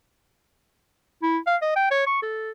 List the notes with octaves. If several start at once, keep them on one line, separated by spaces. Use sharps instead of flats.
E4
F5
D#5
G5
C#5
C#6
A4